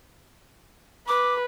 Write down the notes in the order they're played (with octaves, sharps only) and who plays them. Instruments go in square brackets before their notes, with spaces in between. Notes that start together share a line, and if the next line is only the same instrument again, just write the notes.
[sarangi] B4 [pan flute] D6